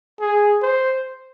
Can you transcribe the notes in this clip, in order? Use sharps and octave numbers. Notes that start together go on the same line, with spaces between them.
G#4
C5